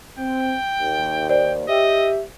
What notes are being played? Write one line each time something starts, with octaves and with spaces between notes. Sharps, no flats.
C4 G5
D#2
C5 D5 G5
G4 D#5 E5